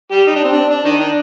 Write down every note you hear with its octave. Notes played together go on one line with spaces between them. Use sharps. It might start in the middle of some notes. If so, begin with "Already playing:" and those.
G3 G4
D#4
D4
C4
D4
D4
D#3 D#4
D4